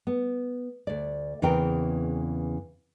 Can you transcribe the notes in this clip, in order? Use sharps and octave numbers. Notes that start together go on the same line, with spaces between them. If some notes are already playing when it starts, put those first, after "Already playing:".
B3
D2 D5
E2 C#3 E3 C4 A#4 G5